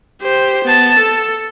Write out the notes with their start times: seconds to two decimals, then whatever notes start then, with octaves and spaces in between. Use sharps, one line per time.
0.22 G4 C5
0.65 B3 A5
0.99 A4